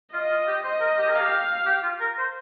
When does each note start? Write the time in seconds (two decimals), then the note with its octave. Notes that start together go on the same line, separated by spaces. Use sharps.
0.12 F4 D#5
0.30 F4
0.47 G4
0.63 C5 D#5
0.80 A#4
0.98 G4
1.08 A#4
1.15 G4 F5
1.66 G4
1.83 F4
2.00 A#4
2.18 C5